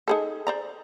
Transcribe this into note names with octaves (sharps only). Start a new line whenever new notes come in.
D#4 G#4 A4
C5 D5 A#5